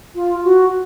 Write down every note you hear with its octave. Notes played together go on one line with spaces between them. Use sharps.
F4
F#4